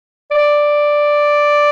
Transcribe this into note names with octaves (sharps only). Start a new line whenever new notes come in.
D5